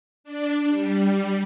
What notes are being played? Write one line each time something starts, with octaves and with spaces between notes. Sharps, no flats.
D4
G3